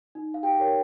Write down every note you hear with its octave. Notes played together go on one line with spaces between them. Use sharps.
D#4
F5
G4 G5
G4 A#4 C#5